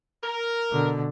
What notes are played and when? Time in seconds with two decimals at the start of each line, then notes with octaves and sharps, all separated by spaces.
0.24 A#4
0.71 B2 D3